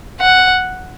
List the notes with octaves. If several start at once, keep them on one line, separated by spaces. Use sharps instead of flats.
F#5